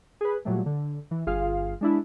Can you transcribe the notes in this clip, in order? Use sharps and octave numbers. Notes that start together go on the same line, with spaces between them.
G#4 B4
A#2 F#3 G3 A3
D3
E3
G1 F4 G#4 F5
G#3 D4 E4